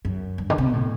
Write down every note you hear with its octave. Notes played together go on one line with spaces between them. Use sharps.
F#2
G2
D3
C3
B2
A2